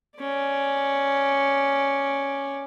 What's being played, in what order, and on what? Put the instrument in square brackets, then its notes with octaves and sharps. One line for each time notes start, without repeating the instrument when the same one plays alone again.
[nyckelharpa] C#4 D5